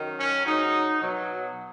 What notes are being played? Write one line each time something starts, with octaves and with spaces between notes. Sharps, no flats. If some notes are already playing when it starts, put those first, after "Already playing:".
Already playing: F#2 D#3 F#3
C#4
G#2 F#3 D#4
B2 F#3